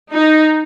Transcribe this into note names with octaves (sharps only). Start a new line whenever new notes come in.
D#4